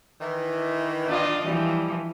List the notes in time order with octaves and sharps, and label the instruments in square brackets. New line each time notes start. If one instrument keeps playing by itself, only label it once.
[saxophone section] D#3 E3
[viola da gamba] D4 F4 D#5
[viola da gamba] E3 F3 [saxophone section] G3